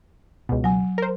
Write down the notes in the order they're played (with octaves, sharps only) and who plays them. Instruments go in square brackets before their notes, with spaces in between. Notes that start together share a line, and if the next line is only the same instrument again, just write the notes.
[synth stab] C#2 B2
[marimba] F#3 G#5
[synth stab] A#4 C5